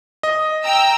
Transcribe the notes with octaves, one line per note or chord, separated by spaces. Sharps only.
D#5
G5 A#5 E6